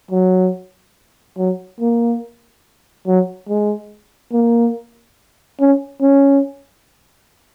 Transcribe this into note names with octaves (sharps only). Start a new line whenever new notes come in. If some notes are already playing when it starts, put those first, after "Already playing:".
F#3
F#3
A#3
F#3
G#3
A#3
C#4
C#4